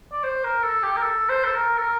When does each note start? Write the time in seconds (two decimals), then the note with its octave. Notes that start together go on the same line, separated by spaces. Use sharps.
0.13 D5
0.24 C5
0.44 A#4
0.64 A4
0.83 G4
0.97 A#4
1.03 A4
1.29 C5
1.44 A4
1.56 A#4
1.78 A4
1.82 A#4